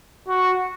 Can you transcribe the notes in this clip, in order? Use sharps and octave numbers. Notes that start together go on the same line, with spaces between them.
F#4